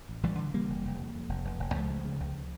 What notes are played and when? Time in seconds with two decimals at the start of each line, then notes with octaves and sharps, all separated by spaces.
0.09 A1
0.23 A1 E3 G3
0.39 D3
0.54 C#3 G3 A#3
0.69 F1
0.85 F1
1.00 F2
1.15 F2
1.29 F1
1.45 F1
1.59 F1
1.74 C#2 F3 A3
1.90 C#3
2.05 C#3
2.20 C#2